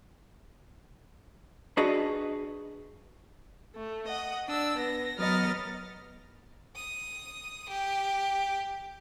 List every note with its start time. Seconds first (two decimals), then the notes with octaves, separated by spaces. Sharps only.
1.77 D4 F#4 G#4 B4 D#5
3.75 A3
4.08 D#5 F#5
4.48 D4 E6
4.79 B3 A#6
5.17 F#3 B3 A#4 D#5 F6 A6
6.76 D#6
7.69 G4